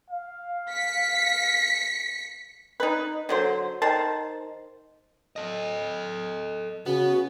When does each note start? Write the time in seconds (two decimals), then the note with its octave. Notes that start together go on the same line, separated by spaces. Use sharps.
0.10 F5
0.71 B6 C#7
2.80 D#4 B4
3.29 D3 F#3 C5
3.82 D#3 C5 A5
5.36 A4 D#5
6.86 C#3 B3 F#4